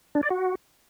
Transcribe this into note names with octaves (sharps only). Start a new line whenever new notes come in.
D4
D5
F#4